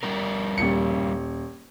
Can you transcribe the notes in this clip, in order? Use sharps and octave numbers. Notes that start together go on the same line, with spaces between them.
G3 D4 A#4
D#1 C#7